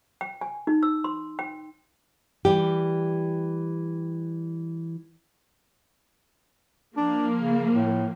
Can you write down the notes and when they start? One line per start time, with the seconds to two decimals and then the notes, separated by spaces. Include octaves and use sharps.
0.21 G5
0.41 G#5
0.67 D#4
0.83 E6
1.04 C6
1.39 G5
2.45 E3 G3 G4
6.97 F3 A#3 D4
7.39 C#3
7.73 A2